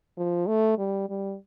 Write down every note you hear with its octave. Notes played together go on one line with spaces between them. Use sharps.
F3
A3
G3
G3